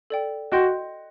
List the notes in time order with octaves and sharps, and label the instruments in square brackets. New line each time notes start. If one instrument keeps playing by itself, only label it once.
[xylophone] A4 D5 G5
[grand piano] F#4 [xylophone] D#5 G5 C6 G6